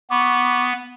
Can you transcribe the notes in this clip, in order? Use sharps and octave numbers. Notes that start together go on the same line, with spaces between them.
B3 B5 C#6 D6